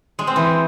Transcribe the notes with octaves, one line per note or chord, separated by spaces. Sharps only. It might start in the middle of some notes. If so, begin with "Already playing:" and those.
G#3
C4
E3